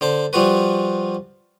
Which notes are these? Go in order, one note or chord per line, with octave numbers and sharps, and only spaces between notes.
D3 C5 A5
F3 G3 F4 F#4 B4